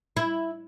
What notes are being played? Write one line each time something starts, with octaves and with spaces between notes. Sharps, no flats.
E4